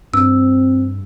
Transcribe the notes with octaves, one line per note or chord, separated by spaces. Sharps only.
G2 C4 E6